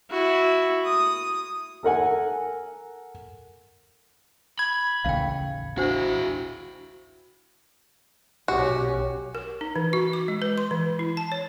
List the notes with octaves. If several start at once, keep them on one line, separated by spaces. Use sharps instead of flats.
E4 F#4
D#6
A4 A#4 F#5 G#5
B5 G#6
A1 D#2 C#3 F5 G5
D4 E4 F#4 C5 F#5
B1 B2 C#4 F#4 G4
A#4
D#4
E3
F#4
D6
G#3
B4
C6
E3
E4
A5
C#5